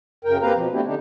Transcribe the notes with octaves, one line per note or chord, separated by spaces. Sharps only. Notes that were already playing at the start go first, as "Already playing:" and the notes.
F#2 C#3 A#4 G5
A#3 C4 G4 B4 F5 A#5
B2 F3
A3 B3 C4 D4 E4 G4
D3 D4 D#4 G4